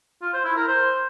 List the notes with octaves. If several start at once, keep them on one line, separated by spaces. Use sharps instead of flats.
F4
C5
E4
A#4
C5